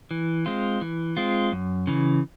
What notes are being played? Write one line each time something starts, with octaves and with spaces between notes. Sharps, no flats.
E3
G#3 C4 F4
E3
G#3 C4 F4
F#2
C#3 E3